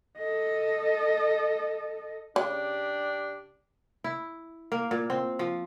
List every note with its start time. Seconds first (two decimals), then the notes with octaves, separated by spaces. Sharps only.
0.17 A4 D#5
2.36 C#3 D4 G4
4.04 E4
4.72 A#3
4.91 A#2
5.10 C4
5.39 F3